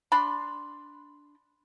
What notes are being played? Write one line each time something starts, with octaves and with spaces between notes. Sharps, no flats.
D4 B5 C6